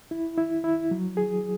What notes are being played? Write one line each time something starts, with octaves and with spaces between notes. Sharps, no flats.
E4
E4
E4
F#3
G#4